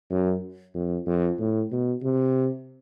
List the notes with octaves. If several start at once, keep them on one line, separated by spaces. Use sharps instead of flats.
F#2
F2
F2
A2
B2
C3